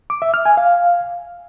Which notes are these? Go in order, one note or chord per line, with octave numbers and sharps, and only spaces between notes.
D6
E5
F6
G#5
F5